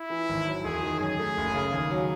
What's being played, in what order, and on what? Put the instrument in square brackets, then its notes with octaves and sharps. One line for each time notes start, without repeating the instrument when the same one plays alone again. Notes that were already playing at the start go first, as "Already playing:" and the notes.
Already playing: [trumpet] E4
[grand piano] E3
G#1
F#3
[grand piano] E1 [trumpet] G#4
[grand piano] D#3
[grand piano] F#2 [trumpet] G#4
[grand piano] A3
F#1
C#3
D#2
F#3